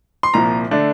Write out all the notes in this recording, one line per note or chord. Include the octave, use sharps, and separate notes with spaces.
C6
C2 A#2 F3 A#5
D3 A3 D4